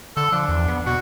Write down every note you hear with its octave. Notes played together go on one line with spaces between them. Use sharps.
D3 A4
F3 D4
E2
B3
B2 F#4